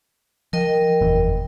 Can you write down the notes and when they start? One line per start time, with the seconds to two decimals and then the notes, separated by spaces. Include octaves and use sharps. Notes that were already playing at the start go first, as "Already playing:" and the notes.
0.53 F3 A#4 D#5 G5
1.01 F#1 E2 A#2